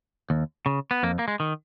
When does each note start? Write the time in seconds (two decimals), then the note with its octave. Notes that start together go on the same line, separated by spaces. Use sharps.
0.30 D#2
0.66 C#3
0.91 B3
1.03 F2 A#3
1.19 A#3
1.28 G#3
1.40 D#3